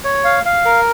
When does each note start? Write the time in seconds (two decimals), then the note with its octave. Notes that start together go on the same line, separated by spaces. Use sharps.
0.04 C#5
0.24 F5
0.45 F5
0.65 A#4